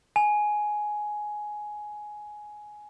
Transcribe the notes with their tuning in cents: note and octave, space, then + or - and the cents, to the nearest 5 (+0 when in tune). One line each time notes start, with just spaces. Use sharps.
G#5 +10